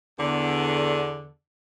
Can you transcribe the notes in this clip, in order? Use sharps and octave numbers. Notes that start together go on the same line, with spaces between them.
E2 D3